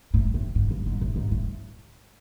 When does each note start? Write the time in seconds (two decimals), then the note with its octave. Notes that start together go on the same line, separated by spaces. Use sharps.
0.14 A2
0.34 A2
0.55 G#2
0.71 G2
0.86 G#2
1.01 A2
1.16 G#2
1.31 A2